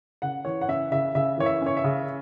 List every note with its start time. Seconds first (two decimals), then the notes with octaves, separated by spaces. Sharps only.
0.22 C#3 F#5
0.45 E3 C#5
0.61 F#5
0.68 C#4 E5
0.91 C#3 E5
1.15 C#3 E5
1.38 E3 C#5
1.46 E5
1.62 C#4 C#5
1.77 E5
1.84 C#3